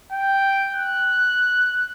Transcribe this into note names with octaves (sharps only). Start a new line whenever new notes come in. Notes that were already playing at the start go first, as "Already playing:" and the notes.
G5
F#6